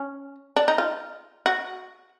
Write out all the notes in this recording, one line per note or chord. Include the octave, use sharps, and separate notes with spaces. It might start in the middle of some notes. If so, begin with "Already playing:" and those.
Already playing: C#4
D4
D#4
F4
F#4